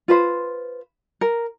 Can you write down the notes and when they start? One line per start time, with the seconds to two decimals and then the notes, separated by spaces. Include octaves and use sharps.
0.08 F4 B4 C5
1.21 A#4